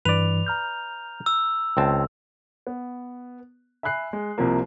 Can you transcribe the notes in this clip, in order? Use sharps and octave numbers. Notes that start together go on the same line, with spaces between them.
G2 E3 B4 D5 F7
A#5 F6 G6
E6
C#2 C4 A5
B3
E5 G#5 B5 F#6 C7
G#3
C2 C3 F3 A#3